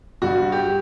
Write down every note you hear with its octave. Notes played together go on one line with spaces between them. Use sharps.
G2 F#4
G4